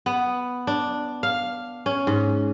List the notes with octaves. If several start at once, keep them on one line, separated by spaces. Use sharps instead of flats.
B3
D4
F5
C#4
G#2